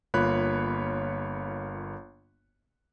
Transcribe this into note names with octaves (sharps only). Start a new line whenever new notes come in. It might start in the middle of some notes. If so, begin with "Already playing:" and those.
G1 A#3 F4 C#5 B5 F#6